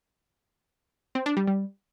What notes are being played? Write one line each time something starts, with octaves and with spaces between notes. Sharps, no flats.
C4
D4
G3
G3